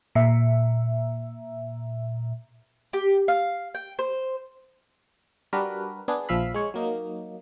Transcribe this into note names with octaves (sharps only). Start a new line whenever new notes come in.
A#2 E5
G4
F5
G5
C5
G3 D4 F#4 A#4 B4
B3 D4 G#4
A#1 F3 E5 F5 B5
G#3 C#5
F#3 A#3 D#4